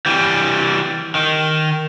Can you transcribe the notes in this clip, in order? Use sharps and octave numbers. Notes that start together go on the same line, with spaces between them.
E3 G3
D#3